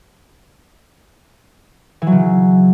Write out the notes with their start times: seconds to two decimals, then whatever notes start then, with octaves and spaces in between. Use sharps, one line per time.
2.02 E3
2.07 F#3
2.12 C#3